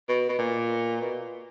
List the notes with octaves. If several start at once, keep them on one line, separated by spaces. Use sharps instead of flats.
B2
B2
A#2
B2